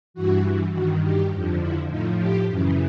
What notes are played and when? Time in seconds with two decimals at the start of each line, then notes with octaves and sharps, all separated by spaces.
0.14 G2 E3 F#4
0.72 G2 D#3 F#4
1.02 G4
1.31 F2 D3 F3
1.60 E4
1.89 A2 F3 D#4
2.18 G4
2.48 F#2 C#3 E3